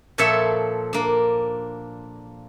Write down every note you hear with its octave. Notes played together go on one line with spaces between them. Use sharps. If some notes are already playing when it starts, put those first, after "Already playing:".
A#2 F3 A4 C#5 E5
A#3 D4